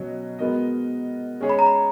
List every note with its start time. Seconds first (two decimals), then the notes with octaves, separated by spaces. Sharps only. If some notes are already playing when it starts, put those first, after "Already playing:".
Already playing: B2 F#3 C#4 D#5
0.39 G#3 B3 F#4 A#4 D#5
1.41 G#3 C#4 G#4 C#5
1.50 B5
1.59 A#5
1.66 B5